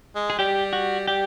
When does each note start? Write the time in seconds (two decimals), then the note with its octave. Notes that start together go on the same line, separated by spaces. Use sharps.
0.15 G#3
0.30 G#4
0.39 G3 G4
0.73 F#4
1.07 G3 G4